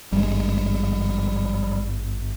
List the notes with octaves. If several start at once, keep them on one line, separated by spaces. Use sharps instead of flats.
G#1 G2 G3 G#3